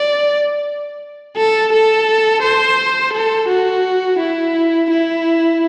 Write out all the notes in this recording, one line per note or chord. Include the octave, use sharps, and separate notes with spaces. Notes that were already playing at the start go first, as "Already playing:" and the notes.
Already playing: D5
A4
A4
C5
A4
F#4
E4
E4